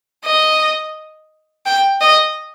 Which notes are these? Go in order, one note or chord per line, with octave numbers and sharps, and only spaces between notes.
D#5
G5
D#5